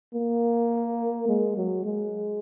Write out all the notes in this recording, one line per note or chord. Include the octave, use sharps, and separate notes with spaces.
A#3
G#3
F#3
G#3